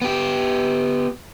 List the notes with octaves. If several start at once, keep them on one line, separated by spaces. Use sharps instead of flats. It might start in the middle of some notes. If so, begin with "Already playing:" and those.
B3 G4